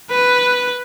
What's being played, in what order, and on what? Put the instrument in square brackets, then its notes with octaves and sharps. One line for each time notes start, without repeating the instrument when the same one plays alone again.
[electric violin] B4